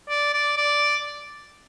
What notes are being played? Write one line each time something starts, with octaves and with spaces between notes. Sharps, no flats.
D5
D5
D5